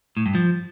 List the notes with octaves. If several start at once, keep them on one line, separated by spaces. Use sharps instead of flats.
A2
G2
F3